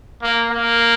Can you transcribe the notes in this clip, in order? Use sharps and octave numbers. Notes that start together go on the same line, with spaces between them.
A#3
A#3